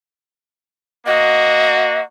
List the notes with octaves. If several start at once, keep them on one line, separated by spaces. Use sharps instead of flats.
A#3 F#4 D#5